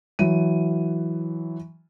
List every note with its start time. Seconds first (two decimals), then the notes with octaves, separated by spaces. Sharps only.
0.19 E3 F#3 D#7